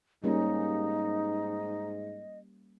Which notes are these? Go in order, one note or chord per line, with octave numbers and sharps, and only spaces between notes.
G#2 G3 A#3 C#4 D#4 D#5